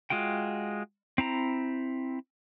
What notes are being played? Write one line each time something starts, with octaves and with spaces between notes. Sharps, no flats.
G#3 F4 F#4 G5
C4 E4 A#5